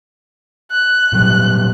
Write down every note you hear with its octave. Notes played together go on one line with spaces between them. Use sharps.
F#6
A#2 F#3 G3